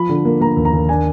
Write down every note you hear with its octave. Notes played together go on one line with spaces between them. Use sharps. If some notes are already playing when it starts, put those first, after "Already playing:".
Already playing: F3 B5
D3
A#3
A#3 A#5
D#2
A#5
D#2
D4 G#5